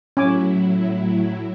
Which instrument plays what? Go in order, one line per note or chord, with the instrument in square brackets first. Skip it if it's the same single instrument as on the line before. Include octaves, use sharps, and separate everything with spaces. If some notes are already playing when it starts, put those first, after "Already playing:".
[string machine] A2 F#3 E4 [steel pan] C#4 G#5 D6